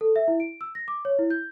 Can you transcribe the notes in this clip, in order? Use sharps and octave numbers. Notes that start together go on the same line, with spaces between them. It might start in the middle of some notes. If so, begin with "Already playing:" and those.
A4
E5
E4
D7
E6
A#6
D6
C#5
E4
G6